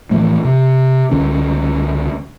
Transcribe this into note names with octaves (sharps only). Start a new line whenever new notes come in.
A2 E3 F3 A3
C3
C#2 D3 C#4